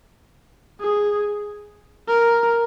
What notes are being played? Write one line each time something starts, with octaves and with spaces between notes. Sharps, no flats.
G#4
A#4